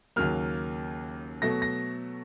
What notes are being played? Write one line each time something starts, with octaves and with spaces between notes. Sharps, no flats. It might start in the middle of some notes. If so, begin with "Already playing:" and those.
D#2 C#3 F#3 A#3 F6
B2 F#3 A3 A#6
A#6